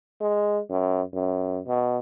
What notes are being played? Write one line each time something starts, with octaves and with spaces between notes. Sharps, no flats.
G#3
F#2
F#2
B2